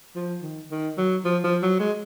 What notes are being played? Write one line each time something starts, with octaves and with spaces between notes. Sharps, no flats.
F3
D#3
D#3
F#3
F3
F3
F#3
G#3